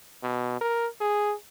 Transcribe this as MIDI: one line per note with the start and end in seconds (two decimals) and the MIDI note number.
0.23 0.59 47
0.61 0.86 70
1.01 1.34 68